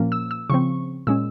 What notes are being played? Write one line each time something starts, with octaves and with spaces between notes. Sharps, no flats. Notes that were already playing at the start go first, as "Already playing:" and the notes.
Already playing: A#2 F3 A#3 C#4
E6
E6
C#3 F3 C4 C#6
A#2 G#3 C#4 E6